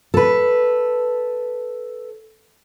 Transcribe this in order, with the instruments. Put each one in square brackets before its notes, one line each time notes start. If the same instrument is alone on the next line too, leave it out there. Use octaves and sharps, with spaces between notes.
[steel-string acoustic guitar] A4 B4